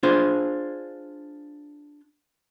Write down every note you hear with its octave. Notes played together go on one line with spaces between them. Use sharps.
D4 F4 G#4 C5